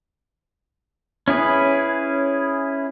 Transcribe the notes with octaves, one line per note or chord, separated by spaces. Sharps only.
C#4 E4 G#4 B4